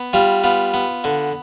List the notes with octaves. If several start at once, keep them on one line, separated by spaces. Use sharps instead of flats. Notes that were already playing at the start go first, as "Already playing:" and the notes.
Already playing: B3
G3 F4
B3 F4
B3
D3